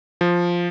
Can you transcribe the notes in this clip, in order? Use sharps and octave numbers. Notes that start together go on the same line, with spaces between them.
F3